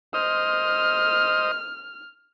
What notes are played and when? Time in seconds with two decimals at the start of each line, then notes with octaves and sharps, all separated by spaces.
0.14 C5 D#5 D#6 F6